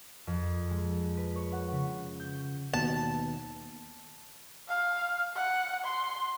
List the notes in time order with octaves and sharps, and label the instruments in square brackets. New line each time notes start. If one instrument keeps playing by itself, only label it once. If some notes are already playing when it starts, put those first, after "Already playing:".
[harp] F2
G#3
B4
C#5
F#5
C#3
G6
[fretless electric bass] D#2 B2 [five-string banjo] A5
[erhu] F5
F#5
C6